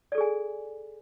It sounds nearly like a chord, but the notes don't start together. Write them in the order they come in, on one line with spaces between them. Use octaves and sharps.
D5 A4 G#4 G#5